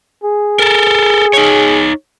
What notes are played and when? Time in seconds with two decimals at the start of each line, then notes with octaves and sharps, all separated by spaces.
0.24 G#4
0.59 A4 A#4
1.33 D#4 C#5